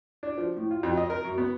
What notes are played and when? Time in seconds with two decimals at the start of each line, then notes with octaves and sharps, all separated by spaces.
0.23 D4
0.38 F3
0.57 A2
0.71 F4
0.83 F2
0.97 D#5
1.10 A#4
1.24 F#2
1.38 B3